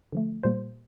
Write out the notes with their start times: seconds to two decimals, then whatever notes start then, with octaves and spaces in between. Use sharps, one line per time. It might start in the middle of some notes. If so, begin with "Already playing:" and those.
0.12 D3 F3 A3
0.43 A#2 G3 A#3 C5